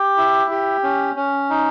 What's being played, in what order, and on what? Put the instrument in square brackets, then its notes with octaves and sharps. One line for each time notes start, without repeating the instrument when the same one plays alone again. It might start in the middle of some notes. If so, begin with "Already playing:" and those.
Already playing: [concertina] G4
E4
G4
C#4
C#4
D#4